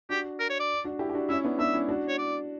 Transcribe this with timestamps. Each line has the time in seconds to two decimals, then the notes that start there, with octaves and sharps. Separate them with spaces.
0.09 D4 F#4 G4
0.40 A#4
0.50 C#5
0.60 D5
0.85 D4 F#4
0.99 E4 G4
1.10 G4
1.14 D4 F#4
1.29 C#4 E4 E5
1.44 B3 D4
1.59 B3 D4 E5
1.74 C#4 E4
1.88 D4 F#4
2.08 C#5
2.18 D5